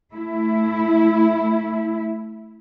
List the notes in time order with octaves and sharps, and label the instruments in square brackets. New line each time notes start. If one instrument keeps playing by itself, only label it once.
[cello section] A3 E4